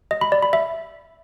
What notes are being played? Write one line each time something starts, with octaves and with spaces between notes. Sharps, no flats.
D#5
B5
D5
B5
E5